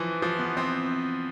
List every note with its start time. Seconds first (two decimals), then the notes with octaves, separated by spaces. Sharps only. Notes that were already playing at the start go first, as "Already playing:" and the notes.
Already playing: E3 F3
0.22 F3
0.39 B3
0.57 C4